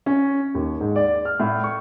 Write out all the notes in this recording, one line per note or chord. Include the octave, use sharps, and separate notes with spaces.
C#4
D#2
G#2
D5
F6
A2
C#6